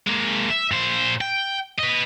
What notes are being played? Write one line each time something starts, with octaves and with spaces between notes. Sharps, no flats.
G#3 A#3
E5
A#2 C5
G5
B4 D#5